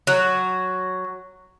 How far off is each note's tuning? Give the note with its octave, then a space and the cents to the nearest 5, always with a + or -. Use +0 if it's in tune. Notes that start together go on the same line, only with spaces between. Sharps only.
F#3 +0 F#4 +0